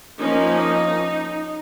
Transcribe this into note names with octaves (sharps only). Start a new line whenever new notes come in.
F3 A#3 C#4 D#4